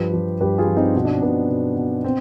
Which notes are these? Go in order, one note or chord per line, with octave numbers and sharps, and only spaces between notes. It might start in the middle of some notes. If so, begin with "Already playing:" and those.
Already playing: G2 F3 G4 B4
F3
G2 G4 B4
F4 G#4
F3
C4 D#4
B2 D#4
D4
C4
B2 B3 D4
B2
B2
C4